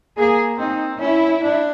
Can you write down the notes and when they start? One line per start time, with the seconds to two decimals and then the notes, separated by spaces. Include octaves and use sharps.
0.18 A#3 G#4
0.59 C4 D#4
1.01 C#4 E4
1.43 D4